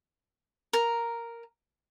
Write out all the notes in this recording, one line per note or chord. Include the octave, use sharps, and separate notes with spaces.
A#4